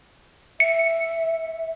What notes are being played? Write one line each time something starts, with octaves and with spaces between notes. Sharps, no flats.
E5 C#7